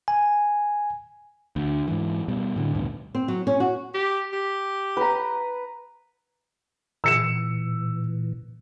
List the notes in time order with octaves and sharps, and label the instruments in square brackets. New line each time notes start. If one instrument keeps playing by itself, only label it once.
[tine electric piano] G#5
[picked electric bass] D2
G#2 E3
B2 G3
A2 D3
A1 D2 G2 B2
[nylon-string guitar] C4
F#3
C#4
F#4
[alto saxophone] G4
G4
[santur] B4 A#5
[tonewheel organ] A#2 E3 [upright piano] E6 C#7 E7